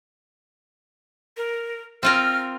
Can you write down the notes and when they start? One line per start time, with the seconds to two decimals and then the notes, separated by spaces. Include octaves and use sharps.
1.37 A#4
2.03 C4 F4 A#4 F6